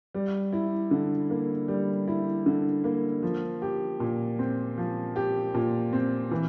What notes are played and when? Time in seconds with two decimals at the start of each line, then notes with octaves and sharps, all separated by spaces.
0.14 G3
0.53 E4
0.91 D3
1.30 A#3
1.68 G3
2.08 E4
2.46 D3
2.84 A#3
3.23 F3
3.62 G4
4.00 A#2
4.39 C4
4.78 F3
5.16 G4
5.54 A#2
5.93 C4
6.31 E3